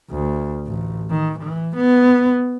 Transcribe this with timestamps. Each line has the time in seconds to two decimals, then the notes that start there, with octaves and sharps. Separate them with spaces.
0.11 D2
0.67 A1
1.10 D#3
1.39 E3
1.76 B3